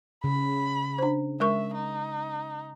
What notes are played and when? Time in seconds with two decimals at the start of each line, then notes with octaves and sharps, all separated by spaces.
0.24 C#3 B5
0.98 D4 C5
1.40 G#3 A#4 E5 C#6
1.74 D#4